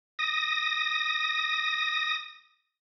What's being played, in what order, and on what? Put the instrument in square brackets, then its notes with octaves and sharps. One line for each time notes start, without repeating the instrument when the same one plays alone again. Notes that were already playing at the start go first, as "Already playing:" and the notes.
[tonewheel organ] D#6 A#6